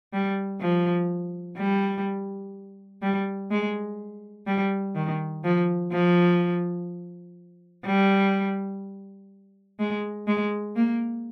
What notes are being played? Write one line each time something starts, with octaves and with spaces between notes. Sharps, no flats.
G3
F3
G3
G3
G#3
G3
D#3
F3
F3
G3
G#3
G#3
A#3